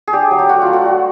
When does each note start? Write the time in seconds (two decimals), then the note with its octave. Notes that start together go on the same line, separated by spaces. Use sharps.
0.08 G#4
0.13 D4 G4
0.31 F#3
0.39 G4
0.49 A3 F#4
0.62 A3 F4
0.73 F#4
0.85 G3